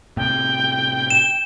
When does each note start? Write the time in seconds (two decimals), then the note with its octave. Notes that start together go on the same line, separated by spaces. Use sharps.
0.17 A2 C3 G5
1.10 E7